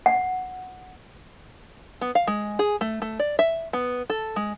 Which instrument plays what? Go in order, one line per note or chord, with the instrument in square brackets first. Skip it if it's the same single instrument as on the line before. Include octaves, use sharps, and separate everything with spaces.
[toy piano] F#5
[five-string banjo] B3
F5
G#3
G#4
A3
A3
D5
E5
B3
A4
G#3